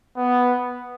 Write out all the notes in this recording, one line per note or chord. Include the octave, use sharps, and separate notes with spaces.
B3